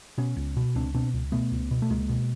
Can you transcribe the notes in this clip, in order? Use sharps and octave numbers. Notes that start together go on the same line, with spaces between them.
B2 B3 C#4
C#2
B2
C#2 C4 D4
B2 C4 D4
C#2
B2 A3 B3
C#2
B2
A3
C#2 G#3 A#3
B2